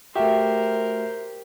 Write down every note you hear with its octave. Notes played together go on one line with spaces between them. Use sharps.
A3 F#4 G4 A#4 C5 E5